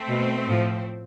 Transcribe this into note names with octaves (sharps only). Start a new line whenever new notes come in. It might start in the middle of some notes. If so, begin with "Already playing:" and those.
Already playing: A3 C4
B2
A2 F3